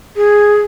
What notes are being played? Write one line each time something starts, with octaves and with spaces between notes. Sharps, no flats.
G#4